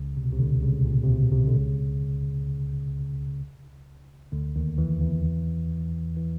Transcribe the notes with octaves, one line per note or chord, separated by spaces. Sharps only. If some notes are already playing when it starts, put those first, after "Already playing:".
Already playing: C#2 C#3
C3
B2
C2 C3
D2 D3
C#2 C#3
A#2
C3
B2
C2 C3
D3
C#2 C#3
D2 D3
D#2 D#3
E2 E3
E2 E3
E3